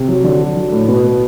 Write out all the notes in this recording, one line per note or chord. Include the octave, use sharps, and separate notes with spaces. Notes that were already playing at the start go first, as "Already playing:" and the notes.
Already playing: C3
F#3
D3 F#3 D4
F#3
F#3
A2
B2 B3